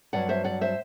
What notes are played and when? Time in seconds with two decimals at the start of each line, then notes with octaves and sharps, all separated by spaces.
0.13 G2 F#3 D5 F#5
0.29 C5 E5
0.44 D5 F#5
0.61 C5 E5